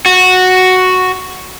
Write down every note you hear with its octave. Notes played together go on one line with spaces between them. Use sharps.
F#4